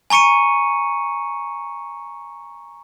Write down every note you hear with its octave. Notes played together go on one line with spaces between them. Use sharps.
G#5 A#5 C#6 C#7 D#7